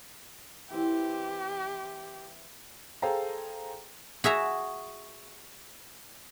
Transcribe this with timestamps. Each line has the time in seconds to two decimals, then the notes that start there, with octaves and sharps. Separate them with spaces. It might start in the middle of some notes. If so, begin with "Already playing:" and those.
0.70 E3 C4 G4
3.02 G#4 A4 C5 F5 G5 A#5
4.24 F#4 G#4 E5 A#5